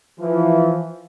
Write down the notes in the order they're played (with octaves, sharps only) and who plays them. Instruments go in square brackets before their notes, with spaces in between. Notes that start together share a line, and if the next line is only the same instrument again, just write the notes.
[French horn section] E3 F3